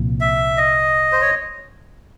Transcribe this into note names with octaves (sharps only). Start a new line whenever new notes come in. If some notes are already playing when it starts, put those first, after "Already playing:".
Already playing: C2 A#2 F3 A#3
E5
D#5
C5
C#5